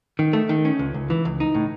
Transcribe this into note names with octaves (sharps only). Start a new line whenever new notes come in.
D#3
A3
D#3
C#4
C#2
C#2
E3
C#2
D#4
A2